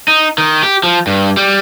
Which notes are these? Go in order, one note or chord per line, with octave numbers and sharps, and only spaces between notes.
D#4
D#3
G4
F3
G2
G3